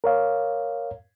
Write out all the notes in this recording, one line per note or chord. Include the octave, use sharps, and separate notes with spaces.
A#4 C#5 F5